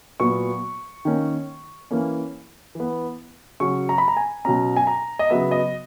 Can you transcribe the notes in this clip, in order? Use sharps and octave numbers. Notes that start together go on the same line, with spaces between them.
A#2 F#3 B3 C#6
D#3 A#3 C#4
E3 A#3 C#4
E3 B3
C#3 F#3 C#4 C#6
A#5
B5
A#5
G#5
B2 F#3 C#4 A#5
G#5
A#5
D#5
C#3 F#3 B3 E5
D#5